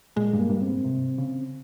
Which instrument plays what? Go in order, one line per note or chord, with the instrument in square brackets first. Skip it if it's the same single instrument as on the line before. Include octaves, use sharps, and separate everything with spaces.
[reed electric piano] A#2 [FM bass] G#3
[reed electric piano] G2
[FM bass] A#3
[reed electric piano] G2
[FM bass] C4
[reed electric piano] G#2
C3
C#3